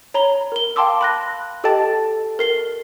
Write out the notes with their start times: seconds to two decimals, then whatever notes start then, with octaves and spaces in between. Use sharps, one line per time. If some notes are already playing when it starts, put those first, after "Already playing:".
0.14 C#5 A#5 B5 G7
0.52 A#4 G7
0.76 F5 G5 A5 C6 D6 E6
1.01 B5 F#6 A#6
1.64 G4 A4 D#5 G5 A5 A6
2.39 A#4 C7 G7